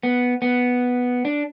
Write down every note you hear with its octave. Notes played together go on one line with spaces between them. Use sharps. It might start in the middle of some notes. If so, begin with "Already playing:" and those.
B3
B3
D4